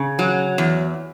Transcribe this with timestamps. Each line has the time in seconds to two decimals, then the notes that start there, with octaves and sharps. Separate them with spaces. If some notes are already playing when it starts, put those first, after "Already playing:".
Already playing: C#3
0.19 F#3
0.58 E2